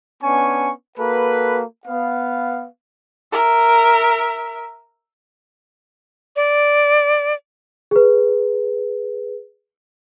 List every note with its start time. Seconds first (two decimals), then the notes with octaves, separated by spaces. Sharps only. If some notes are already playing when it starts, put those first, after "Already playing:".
0.23 B3 C#4 D4 G#5 C#6
0.98 A#3 F#4 A4 B4
1.86 B3 F5
3.33 A#4 E5
6.36 D5
7.91 G#4 B4